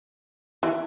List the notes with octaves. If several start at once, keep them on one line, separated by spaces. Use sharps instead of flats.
E3